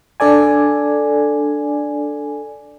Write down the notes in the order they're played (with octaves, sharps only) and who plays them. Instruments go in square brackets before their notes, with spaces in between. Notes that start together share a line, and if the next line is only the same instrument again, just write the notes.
[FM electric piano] D4 A4 D5 G#5